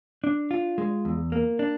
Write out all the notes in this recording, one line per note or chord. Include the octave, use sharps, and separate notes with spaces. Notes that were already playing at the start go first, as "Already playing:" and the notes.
D4
F4
G#3
E2
A#3
D4